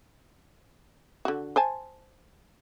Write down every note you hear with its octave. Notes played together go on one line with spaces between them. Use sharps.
D3 F#4
C5 G#5 A5